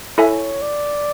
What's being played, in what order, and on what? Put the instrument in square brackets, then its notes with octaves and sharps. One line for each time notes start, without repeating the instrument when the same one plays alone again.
[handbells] E4 A4 E5 G#5 [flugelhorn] C#5
[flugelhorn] D5